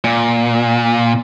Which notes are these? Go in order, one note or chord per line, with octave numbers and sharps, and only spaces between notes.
A#2